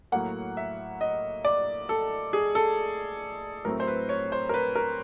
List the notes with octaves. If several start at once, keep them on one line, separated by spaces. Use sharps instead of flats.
A2 F#3 A#3 F#5
E5
D#5
D5
A4
G#4
A4
A2 F#3 A3 C4 A#4
C5
B4
C#5
C5
A#4
B4
A#4